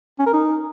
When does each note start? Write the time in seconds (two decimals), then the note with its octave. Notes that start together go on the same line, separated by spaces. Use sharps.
0.19 C#4
0.26 A#4
0.33 D#4